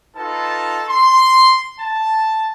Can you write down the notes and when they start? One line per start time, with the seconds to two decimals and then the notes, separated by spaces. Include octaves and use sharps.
0.17 D#4 F4 A4 B4 A5
0.89 C6
1.81 A5